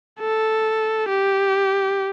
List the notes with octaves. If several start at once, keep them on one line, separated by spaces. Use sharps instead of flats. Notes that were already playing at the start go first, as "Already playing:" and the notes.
A4
G4